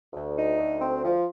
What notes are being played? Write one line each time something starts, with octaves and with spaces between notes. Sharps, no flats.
D2
D#4
D2
C4
F3